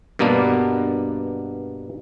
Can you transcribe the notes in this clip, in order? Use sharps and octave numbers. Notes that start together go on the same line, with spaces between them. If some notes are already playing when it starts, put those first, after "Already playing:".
G2 B2 A#3 B3 D4